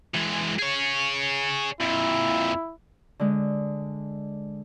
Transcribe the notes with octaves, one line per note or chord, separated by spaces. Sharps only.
E3 G#3
G#4 C#5
F2 A#2 E4
D3 G#3